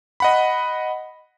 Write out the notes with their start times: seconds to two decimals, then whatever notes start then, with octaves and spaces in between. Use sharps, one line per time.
0.20 D#5 F#5 B5